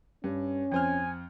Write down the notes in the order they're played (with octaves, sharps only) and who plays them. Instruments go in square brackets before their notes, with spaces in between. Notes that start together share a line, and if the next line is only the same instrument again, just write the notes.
[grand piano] G2 [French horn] C#4
[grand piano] F2 C5 F6 [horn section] G#5